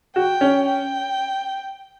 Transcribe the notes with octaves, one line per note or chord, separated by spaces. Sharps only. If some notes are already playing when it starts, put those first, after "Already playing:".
F#4 G5
C#4
G5